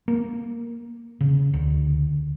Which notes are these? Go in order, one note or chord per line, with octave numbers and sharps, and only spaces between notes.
A#3
C#3
D2